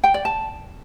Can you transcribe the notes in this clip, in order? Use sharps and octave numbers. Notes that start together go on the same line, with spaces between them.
G5
D5
A5